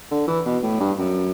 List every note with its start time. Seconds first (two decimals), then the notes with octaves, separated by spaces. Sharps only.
0.11 D3
0.27 E3
0.46 B2
0.63 A2
0.80 G2
0.98 F#2